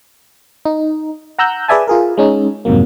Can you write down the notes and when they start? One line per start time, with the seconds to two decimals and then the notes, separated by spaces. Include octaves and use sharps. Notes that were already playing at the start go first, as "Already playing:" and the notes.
0.65 D#4
1.39 F#5 A#5 E6 F#6 G6
1.68 G#4 B4 D5 E5 G#5 A5
1.88 F4 G#4 A#4
2.18 G#3 C#4 D#4
2.65 F2 G#2 C3 F#3 A#3